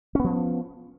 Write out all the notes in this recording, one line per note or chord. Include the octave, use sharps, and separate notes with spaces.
F3 B3 C#4